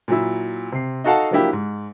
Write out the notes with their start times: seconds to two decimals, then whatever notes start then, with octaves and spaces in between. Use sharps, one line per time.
0.08 A#2 F#3 E4
0.72 C3 C7
1.04 D#4 F#4 A4 F5 F#5 A5
1.31 F3 F#3 A#3 D4 E4 G4
1.53 G#2